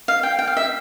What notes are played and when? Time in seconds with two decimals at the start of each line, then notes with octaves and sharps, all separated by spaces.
0.08 F5
0.23 G5
0.39 G5
0.47 F5
0.57 E5